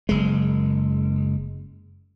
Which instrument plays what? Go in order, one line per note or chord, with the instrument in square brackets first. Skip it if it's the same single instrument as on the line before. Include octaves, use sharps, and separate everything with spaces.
[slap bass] F#1 G#3